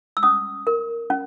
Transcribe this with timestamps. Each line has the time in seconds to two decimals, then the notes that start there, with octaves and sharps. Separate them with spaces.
0.17 E6
0.23 C#4 D#6
0.67 A#4
1.10 C#4